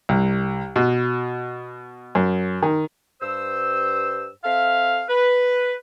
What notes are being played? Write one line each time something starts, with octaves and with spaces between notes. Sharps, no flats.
C2
B2
F#2
D#3
G2 C5 E6
C4 A4 E5 F5
B4